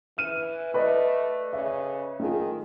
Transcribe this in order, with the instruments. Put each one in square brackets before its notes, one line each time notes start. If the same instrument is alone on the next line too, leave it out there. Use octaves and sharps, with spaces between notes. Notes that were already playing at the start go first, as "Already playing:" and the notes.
[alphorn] E3 [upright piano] F6 D#7
[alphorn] A3 [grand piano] B4 D5 D#5
[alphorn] C#3 [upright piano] E5
[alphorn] D#3 [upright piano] A3 F4 G#4